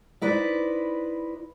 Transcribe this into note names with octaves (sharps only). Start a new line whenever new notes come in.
D#4 E4 B4 C5 D5